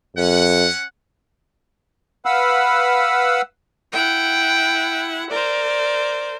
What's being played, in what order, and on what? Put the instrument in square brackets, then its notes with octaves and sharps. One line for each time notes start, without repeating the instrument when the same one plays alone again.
[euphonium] F2 [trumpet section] C#4 F#5
[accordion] B4 F5 F#5 B5 E6
[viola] E4 F#5 [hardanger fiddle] G5
[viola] A#4 C5 [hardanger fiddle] D5